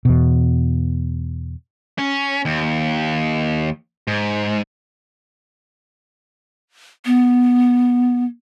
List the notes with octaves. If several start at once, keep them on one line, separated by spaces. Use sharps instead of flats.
E2 B2
C#4
D#2
G#2
B3